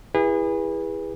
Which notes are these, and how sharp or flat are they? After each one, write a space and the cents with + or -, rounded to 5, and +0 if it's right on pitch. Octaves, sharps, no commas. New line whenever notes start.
E4 +5 G#4 -30 B4 -15